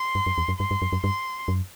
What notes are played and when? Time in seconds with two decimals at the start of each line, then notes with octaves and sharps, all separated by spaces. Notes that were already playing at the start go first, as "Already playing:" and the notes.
Already playing: C6
0.15 G2
0.26 F#2
0.38 E2
0.48 F#2
0.59 G2 C6
0.71 G2
0.82 F#2
0.92 F#2
1.03 G2 C6
1.48 F#2